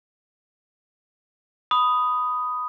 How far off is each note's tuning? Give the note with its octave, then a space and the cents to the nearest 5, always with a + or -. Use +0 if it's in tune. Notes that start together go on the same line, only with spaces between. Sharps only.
B5 +10 D#6 +0